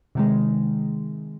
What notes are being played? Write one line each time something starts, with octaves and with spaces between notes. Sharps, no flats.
C3 D#3 G#3